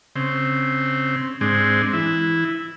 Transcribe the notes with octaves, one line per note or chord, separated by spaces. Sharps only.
C#3 C4
G#2 G#3 C4 D4
E3 E4